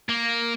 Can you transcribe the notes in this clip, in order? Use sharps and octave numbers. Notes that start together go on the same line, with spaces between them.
A#3